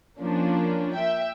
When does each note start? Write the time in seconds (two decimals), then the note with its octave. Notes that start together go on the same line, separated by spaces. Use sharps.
0.20 F3 A#3 C#4 D4
0.96 E5 G5